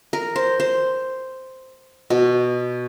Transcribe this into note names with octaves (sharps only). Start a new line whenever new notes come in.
A#4
C5
C5
B2